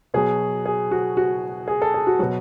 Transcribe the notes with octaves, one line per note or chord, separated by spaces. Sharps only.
B2 F#3 G#4
G#4
F#4
F#4
G#4
A4
G#4
F#4
B2 F#3 F#4